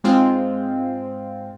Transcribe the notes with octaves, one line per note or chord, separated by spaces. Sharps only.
G#2 G#3 C4 F4